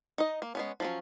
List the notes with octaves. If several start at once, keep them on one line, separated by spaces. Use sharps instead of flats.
D#4 D#5
A#3
G#3 B3 C#4
F3 F#3 C#4